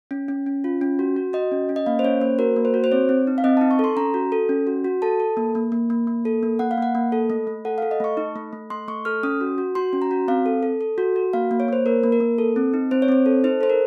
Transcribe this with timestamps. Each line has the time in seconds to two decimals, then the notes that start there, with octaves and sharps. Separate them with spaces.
0.11 C#4
0.28 C#4
0.46 C#4
0.64 F4
0.81 C#4
0.99 F#4
1.16 F#4
1.33 F#4 D#5
1.52 C#4
1.69 C#4
1.76 D#5
1.86 A#3 F5
1.99 C5
2.04 C#4 C#5
2.21 A#3 C5
2.38 F#4 A#4
2.56 A#3
2.65 C5
2.74 F#4
2.84 C5
2.91 C4 C#5
3.09 C4
3.27 D#4
3.38 F5
3.44 C4 D#5
3.57 A5
3.61 D#4
3.71 C#6
3.79 A4 C6
3.96 C#4 A#5
4.14 F#4
4.32 A4
4.49 C#4
4.67 F#4
4.85 F#4
5.02 A4 A5
5.20 A4
5.37 A#3
5.55 A#3
5.72 A#3
5.90 A#3
6.07 A#3
6.25 A4
6.43 A#3
6.59 A#3 F#5
6.71 F5
6.78 A#3 F#5
6.95 A#3
7.12 A4
7.30 A3
7.47 A3
7.65 A4 F#5
7.78 F5
7.82 A4
7.91 D#5
8.00 A3 C#6
8.17 D#4
8.36 A3
8.53 A3
8.70 A3 C6
8.88 A3 C#6
9.05 A4 F6
9.23 C#4 D#6
9.41 F#4
9.58 F#4
9.75 F#4 C6
9.93 C#4
10.02 A#5
10.11 F#4
10.28 C4 F5
10.46 A4
10.63 A4
10.81 A4
10.98 F#4
11.16 F#4
11.33 A#3 F5
11.51 A#3
11.60 C#5
11.68 A#3 C5
11.86 A#3 A#4
12.04 A#3
12.12 A#4
12.20 A#3
12.38 A4
12.56 C4
12.74 D#4
12.91 C4 C5
13.02 C#5
13.08 C4 C5
13.26 A4
13.44 D#4 C5
13.61 A4 C5
13.70 A#4